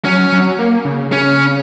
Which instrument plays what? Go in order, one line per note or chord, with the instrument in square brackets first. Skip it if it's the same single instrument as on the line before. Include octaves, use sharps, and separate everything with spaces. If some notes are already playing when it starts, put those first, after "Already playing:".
[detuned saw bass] F#3 [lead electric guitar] C#4
[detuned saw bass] F#3
A#3
C#3
[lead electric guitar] C#4